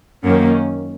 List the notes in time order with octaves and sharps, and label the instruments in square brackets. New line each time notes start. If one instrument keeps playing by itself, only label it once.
[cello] F#2 [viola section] D#3 A#3 C#4